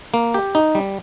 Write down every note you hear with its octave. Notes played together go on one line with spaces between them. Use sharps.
A#3
G4
D#4
G3